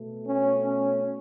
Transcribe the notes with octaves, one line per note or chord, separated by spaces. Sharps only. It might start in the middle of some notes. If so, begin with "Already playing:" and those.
Already playing: B2 A3
C#4
C#4